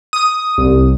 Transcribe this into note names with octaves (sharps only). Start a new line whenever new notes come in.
D#6
C2